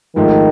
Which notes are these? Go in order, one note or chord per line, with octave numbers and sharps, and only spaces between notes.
G#2 D#3 F3 A3